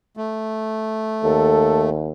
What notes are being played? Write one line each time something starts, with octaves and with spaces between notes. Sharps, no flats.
A3
D#2 A4